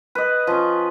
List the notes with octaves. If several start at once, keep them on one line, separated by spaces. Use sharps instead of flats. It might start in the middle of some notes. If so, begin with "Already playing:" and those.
B4 D#5
F3 C#4